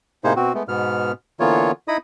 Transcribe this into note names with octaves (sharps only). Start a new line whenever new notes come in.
A2 C3 A#3 D#4 G#4 C5
B2 C4 F#4
G#3 A3 B3
G#2 B2 B3 F6
D3 E3 A#3 B3 F4 C#5
D#4 E4 D#5 B5 D#6